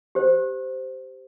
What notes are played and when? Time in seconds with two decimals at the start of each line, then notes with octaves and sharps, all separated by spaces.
0.15 G4 C5